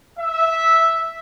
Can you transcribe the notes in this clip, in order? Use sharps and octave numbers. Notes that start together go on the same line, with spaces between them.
E5